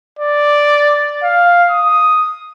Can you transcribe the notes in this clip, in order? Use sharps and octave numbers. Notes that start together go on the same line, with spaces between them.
D5
F5
D#6